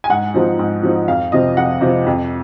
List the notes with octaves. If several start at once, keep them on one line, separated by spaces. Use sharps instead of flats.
G#5
G#2 F#5
F3 C4 D#4
G#2
F3 C4 D#4
F2 F5
C3 F3 C4 D#5
F2 F#5
C3 F3 C4
F2